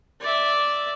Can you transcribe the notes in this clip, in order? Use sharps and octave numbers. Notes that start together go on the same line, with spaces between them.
D5 E5